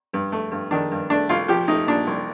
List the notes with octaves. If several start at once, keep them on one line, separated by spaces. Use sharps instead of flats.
G2
A3
G2
D#3 D4
G2
A3 D4
C2 F4
F3 G4
A3 D#4
A#2 D4
C2